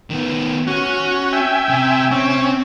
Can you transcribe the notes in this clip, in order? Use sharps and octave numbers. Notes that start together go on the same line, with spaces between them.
D#3 B3
C#4 F#4
E5 G5 G#5
C3
C4 C#4